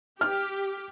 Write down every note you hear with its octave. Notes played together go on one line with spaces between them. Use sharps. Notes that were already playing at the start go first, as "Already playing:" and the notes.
G4 F6